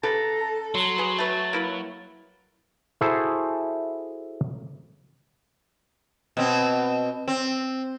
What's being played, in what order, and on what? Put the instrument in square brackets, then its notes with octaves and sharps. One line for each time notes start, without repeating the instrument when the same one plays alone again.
[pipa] C#3 G4 B4 [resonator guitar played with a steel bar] A4 [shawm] A#5
[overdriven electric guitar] F#3 [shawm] C6
[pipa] G#4 B4
[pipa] A3 B4 [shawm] A5
[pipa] A#3 E4 B4
[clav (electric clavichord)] E4 F#4 G#4 A4 C5
[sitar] B2 C4
C4